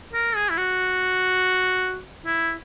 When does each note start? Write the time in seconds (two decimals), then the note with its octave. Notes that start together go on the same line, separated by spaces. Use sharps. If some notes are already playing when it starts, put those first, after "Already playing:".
0.13 A#4
0.35 G#4
0.50 E4
0.58 F#4
2.25 E4